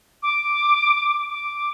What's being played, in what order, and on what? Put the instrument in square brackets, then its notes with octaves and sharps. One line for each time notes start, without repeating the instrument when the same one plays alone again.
[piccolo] D6
D6